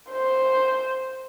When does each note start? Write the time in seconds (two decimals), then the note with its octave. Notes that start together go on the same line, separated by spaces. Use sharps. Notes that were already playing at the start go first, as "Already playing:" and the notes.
0.11 C5